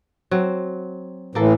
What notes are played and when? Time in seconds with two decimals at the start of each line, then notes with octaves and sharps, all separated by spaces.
0.31 F#3 C4
1.35 A2 E3 A#3 A4